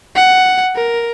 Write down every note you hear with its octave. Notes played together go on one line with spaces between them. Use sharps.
F#5
A#4